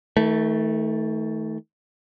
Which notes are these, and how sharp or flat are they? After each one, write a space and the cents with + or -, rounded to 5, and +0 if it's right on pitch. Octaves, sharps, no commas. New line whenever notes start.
D#3 +45 A3 +0